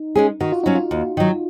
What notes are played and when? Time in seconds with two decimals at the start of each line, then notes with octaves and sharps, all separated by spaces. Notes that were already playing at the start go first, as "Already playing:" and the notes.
Already playing: D#4
0.15 G#3 C#4 G#4
0.40 D#3 F#4
0.52 F4
0.64 F#3 C#4 D#4
0.75 F4
0.91 D#2
1.17 D#3 F#3